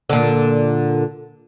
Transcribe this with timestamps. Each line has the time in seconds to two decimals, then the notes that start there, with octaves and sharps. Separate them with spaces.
0.09 A#2 D3